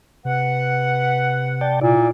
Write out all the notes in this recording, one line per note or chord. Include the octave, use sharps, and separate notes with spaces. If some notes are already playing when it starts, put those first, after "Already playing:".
C3 B4 F#5
D5 G5 A5
A#2 E4 D5